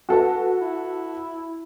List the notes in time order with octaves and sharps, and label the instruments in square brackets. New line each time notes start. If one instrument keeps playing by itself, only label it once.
[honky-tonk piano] F#4 A4 B4
[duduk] E4